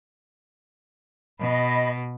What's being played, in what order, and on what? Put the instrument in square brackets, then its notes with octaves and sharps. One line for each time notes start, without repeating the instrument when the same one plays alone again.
[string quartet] B2 [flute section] D#5 B5